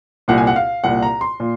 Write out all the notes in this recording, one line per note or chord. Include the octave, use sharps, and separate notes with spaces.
C2 A#2 F#5
G#5
F#5
F5
C2 A#2 F#5
A#5
C6
A#2